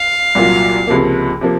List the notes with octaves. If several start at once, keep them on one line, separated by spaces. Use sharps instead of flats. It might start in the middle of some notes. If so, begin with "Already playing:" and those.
Already playing: F5
C2 A#2 F#3 A#3 F4
C#2 C3 F3 A#3
C3 F3 A#3